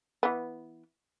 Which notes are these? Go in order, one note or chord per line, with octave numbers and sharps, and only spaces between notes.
E3 B3